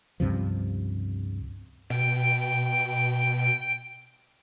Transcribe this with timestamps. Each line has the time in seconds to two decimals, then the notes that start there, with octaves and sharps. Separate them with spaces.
0.20 C#2 G2 C3 F3
1.90 B2 G5